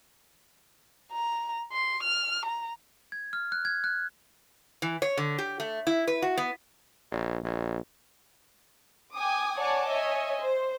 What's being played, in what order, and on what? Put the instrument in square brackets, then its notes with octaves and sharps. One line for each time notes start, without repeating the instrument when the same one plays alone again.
[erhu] A#5
C6
F6
A#5
[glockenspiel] G#6
F6
F#6
G#6
F#6
[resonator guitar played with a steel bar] E3
C#5
D3
G4
A3
E4
B4
F#4
B3
[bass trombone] A#1
A#1
[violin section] G5 G#5 D6 D#6
C#5 D5 F#5 G#5 A5 D6
C#5 D#5 E5 G#5
C5